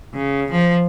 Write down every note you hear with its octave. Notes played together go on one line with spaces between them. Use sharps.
C#3
F3